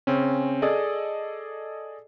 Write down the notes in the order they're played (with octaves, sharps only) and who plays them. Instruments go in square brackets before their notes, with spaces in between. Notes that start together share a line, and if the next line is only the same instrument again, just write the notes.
[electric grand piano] C#3 C4 C#4
G#4 A4 D5 D#5